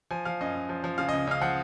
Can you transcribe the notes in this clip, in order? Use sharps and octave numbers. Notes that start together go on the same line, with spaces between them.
F3 G#5
F3 F5
F#2 D#5
F#2
F3
F3
C#3 F5
D#5
C#2
C#2 F5
F3 F#5